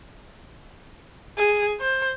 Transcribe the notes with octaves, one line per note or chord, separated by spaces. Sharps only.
G#4
C5